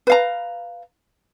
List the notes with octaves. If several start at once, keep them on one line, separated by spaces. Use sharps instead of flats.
B4 F5 A#5